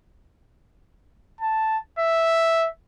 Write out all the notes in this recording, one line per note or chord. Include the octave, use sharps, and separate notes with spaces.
A5
E5